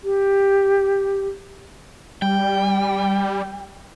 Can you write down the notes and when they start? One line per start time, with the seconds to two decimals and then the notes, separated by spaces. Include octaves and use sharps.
0.04 G4
2.22 G3 G5